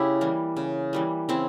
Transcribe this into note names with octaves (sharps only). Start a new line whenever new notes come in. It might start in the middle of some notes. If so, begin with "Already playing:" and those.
Already playing: C#3 E4 G4
E3 G3 A#3
C#3
E3 G3 A#3
C#3 C4 E4